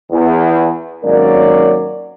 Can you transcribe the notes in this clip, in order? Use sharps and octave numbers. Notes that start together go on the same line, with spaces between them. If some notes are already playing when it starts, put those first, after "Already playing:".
E2
G#1 F#3 A#3 C#4 A#4 D5